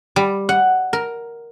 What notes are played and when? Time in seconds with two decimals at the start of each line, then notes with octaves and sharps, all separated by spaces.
0.16 G3
0.49 F#5
0.93 A#4